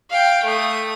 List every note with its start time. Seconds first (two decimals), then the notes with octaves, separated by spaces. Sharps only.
0.10 F5 G5
0.44 A3 D#6